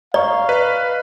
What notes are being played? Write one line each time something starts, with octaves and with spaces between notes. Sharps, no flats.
D5 F5 A#5 C#6
B4 D#5